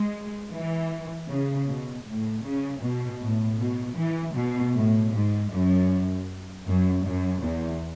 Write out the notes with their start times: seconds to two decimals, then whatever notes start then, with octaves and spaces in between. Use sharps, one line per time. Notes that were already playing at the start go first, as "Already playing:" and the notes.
Already playing: G#3
0.52 E3
1.28 C#3
1.68 B2
2.06 A2
2.43 C#3
2.82 B2
3.21 A2
3.59 B2
3.97 E3
4.36 B2
4.75 A2
5.12 G#2
5.51 F#2
6.66 F#2
7.05 F#2
7.43 E2